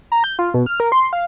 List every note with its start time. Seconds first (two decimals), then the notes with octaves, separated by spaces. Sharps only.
0.12 A#5
0.24 G6
0.39 F4
0.54 B2
0.66 F6
0.80 A#4
0.92 C6
1.13 F5